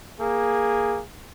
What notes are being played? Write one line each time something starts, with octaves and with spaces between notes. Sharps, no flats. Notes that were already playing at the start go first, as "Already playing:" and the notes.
A#3 G#4